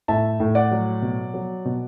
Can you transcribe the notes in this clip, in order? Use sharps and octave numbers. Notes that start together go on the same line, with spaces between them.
A2 E5 A5
A2
D5 F#5
F#3
B2
F#3
B2